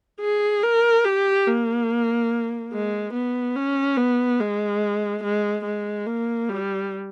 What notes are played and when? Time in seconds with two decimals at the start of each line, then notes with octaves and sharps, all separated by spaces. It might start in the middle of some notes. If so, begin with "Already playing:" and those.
0.20 G#4
0.63 A#4
1.04 G4
1.46 A#3
2.73 G#3
3.14 B3
3.56 C#4
3.98 B3
4.40 G#3
5.23 G#3
5.65 G#3
6.06 A#3
6.49 G3